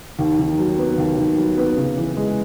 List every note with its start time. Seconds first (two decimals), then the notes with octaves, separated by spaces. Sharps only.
0.19 D#2
0.39 D#3
0.58 F#3
0.78 B3
0.98 D#2
1.18 D#3
1.38 F#3
1.57 B3
1.77 C#3
1.97 E3
2.17 G#3